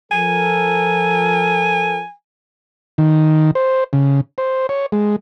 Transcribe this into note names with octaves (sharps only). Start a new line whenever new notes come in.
F3 A4 A#4 G#5
D#3
C5
C#3
C5
C#5
G#3